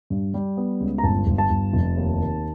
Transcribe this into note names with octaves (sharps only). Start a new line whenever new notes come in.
G2
G3
B3
C#2
A#5
G1 A5
G1
A5
G1
F1
D#2
D#3